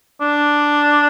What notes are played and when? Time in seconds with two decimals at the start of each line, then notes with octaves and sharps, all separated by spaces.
0.21 D4